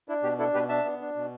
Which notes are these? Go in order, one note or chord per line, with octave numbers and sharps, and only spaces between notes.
D4 E4
B2 G4
D4 E4 A4
B2 G4 B4
D4 E5 A5
B3
D4
B2